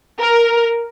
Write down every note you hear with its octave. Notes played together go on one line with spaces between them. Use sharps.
A#4